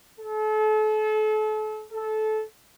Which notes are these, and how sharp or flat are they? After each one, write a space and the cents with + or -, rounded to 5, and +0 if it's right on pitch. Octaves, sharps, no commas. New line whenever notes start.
A4 -35
A4 -20